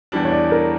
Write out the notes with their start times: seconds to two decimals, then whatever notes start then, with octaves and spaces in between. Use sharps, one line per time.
0.12 E2 E3 G3 D4
0.25 C#5
0.32 D5
0.52 A#4